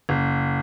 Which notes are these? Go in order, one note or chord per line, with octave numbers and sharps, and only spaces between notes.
F#1